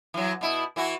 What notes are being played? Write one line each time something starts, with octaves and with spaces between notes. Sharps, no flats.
E3 F#3
B2 E4
E3 E4 F#4